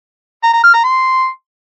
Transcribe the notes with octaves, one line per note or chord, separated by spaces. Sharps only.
A#5
A#5
F6
A#5
C6